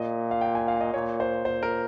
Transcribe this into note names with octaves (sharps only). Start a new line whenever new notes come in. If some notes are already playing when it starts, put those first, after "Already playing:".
Already playing: A#2 D#5
F5
G5
G#5
F5
D#5
A#2 C#5
C5
A#2 C5
A#4